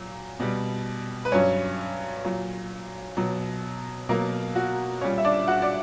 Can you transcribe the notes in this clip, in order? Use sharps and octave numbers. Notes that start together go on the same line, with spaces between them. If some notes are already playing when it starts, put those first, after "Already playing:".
Already playing: A#2 F#3
B2 G3
B4
G2 F#3 C#4 C#5
A#2 F#3
B2 F#3
B2 F#3 A#3 A#4
F#4
A#2 G3 C#4 C#5
E5
D4 D5
F#4 F#5
D5